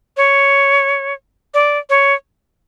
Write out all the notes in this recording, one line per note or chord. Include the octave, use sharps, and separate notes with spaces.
C#5
D5
C#5